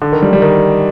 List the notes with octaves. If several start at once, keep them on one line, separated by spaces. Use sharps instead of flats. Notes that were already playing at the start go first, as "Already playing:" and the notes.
D3
D#3
G3
G3
D#3